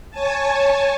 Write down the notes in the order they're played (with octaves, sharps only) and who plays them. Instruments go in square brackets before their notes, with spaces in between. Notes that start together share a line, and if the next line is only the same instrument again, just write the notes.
[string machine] C#5 G#5 A5